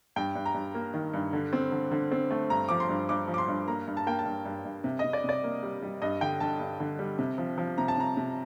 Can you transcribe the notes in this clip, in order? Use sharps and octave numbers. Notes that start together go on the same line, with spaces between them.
G2 G5
G2
A#5
G2
A#3
D#3
G2
D3
C4
D3
D3
C4
A3
G2 A#5
F3 D6
C6
G2
G2 D6
F3
D6
C6
G2
A#3 A#5
G2
A5
A#3 G5
A5
G2
G2
G2
C3
C3 D#5
D5
C3 D5
A#3
G3
G3
G2 D#5
D3 G5
D3 A5
G2
D3
G3
C3
F3
F3
C3 A#5
A5
C3 A#5
C3